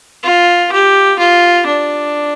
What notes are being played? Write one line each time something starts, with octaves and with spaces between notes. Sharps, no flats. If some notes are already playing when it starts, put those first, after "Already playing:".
F4
G4
F4
D4